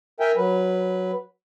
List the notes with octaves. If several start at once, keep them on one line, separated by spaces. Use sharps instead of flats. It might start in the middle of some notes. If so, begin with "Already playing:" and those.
A#4 E5 G5 G#5
F#3 B4